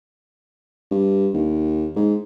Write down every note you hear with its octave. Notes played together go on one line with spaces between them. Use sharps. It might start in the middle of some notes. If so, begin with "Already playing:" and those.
G2
D#2
G#2